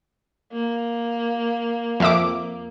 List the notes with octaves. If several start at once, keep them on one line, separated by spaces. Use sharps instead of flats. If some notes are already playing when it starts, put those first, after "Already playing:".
A#3
F2 E5 D6